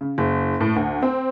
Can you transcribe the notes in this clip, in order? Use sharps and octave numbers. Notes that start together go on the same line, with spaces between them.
C#3
F#1
A2
D2
C4